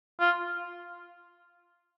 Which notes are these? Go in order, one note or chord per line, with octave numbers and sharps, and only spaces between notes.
F4